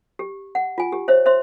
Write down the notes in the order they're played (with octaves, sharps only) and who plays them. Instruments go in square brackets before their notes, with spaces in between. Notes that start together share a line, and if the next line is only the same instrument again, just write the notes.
[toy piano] G4
F#5
F4 G#5
G4
C5 C#5 E5
C5 E5 C6